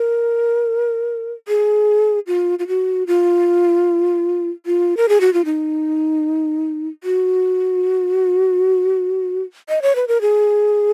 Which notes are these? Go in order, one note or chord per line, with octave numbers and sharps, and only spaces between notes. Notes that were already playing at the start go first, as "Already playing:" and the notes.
Already playing: A#4
G#4
F4
F4
F#4
F4
F4
A#4
G#4
F#4
F4
D#4
F#4
D#5
C#5
B4
A#4
G#4